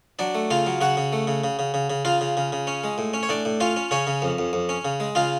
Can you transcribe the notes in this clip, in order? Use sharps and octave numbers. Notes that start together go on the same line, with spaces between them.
F#3 D4 D5
A3
C#3 F4 F5
F#3
C#3 F#4 F#5
C#3
A3
C#3
C#3
C#3
C#3
C#3
C#3 F4 F5
C#3
C#3
C#3
C#4
G#3
A2
C#4
C#5
A2 D4 D5
A2
C#4 F4 F5
C#4
C#3 C#4 C#5
C#3
F2
F2
F2
C#4
C#3
G#3
C#3 F4 F5